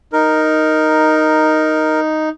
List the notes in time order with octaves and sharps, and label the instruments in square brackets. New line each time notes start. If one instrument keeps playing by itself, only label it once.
[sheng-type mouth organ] D#4 [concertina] A#4